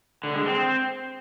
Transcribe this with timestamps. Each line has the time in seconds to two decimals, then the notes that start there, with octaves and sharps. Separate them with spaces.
0.24 D3
0.35 G#3
0.46 C4